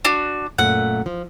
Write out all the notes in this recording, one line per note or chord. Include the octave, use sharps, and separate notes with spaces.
D4 F#4
F#2 A#2 A3 F#5
F3